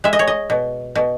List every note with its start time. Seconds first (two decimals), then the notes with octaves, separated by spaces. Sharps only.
0.04 G#3 E5
0.13 D#5
0.19 C#5
0.27 D#5
0.50 B2
0.95 B2